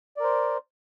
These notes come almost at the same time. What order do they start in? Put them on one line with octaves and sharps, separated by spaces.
D5 A#4 C5